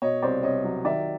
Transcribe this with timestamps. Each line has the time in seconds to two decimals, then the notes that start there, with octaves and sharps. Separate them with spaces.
0.02 B2 C#5 D#5
0.22 C2 C5 D5
0.43 C2 C#5 D#5
0.64 F#3
0.84 D#3 D5 E5